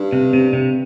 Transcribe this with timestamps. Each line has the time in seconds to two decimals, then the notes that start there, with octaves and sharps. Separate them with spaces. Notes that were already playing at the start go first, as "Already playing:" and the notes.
Already playing: G2
0.13 C3
0.33 C3
0.53 C3